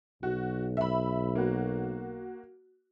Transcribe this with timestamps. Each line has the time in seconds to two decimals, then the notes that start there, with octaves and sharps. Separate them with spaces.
0.23 B1 F#4
0.77 E5 B5
1.35 A#3 F#4